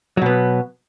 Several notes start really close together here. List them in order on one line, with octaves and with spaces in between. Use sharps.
F#3 B2 B3